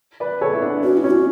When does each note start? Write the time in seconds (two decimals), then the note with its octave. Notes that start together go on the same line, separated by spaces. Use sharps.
0.20 B4 D5
0.41 A4 C#5
0.53 E4
0.62 B3 D4
0.83 C#4 F#4
0.97 E4
1.04 C#4
1.11 F#4